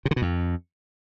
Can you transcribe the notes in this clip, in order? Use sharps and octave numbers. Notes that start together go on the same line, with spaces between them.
C3
D3
B2
F2